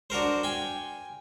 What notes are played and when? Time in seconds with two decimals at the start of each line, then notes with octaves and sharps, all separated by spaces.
0.10 D4 F#4 A#4 C5
0.43 G5 G#5